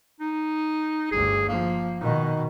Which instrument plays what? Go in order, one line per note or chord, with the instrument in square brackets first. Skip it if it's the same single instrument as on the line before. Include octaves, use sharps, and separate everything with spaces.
[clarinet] D#4
[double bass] G1 D2 [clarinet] G#4
[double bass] F3 [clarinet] A#3
[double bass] B2 D#3 [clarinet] D#4